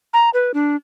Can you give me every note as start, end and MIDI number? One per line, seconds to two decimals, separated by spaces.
0.13 0.30 82
0.34 0.52 71
0.54 0.76 62